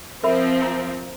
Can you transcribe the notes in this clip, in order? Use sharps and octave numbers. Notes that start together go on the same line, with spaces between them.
F3 C4 A#4 E5 B5
A#5